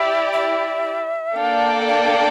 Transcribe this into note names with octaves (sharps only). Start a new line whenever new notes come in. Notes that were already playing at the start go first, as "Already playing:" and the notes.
Already playing: E4 G4 D5 E5
E5
A#3 D4 A4 D5 F5 G5
F5
F5